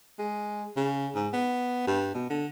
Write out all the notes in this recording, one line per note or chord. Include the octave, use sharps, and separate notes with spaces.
G#3
C#3
G#2
B3
G2
B2
D3